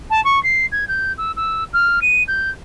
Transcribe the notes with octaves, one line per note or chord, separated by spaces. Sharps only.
A5
C#6
C7
G#6
G6
E6
E6
F6
D#7
G6